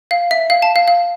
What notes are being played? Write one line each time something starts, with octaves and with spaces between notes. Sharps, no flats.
F5
E5
F5
A5
F5
F5